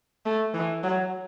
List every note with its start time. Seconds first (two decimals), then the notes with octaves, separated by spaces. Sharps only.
0.26 A3
0.54 E3
0.83 F#3